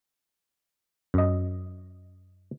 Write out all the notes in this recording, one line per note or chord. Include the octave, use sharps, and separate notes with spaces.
F#2 D#5